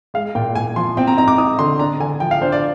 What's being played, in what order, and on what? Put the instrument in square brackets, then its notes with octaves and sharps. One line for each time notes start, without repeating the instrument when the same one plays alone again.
[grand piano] G#3 F5
A#2 G5
A#2 G#5
F3 C6
C4 G5
A#5
D#4 A#5
D6
D#4 D#6
D3 C6
D4 A#5
D3 G#5
F3 G5
F5
D4 C5
D5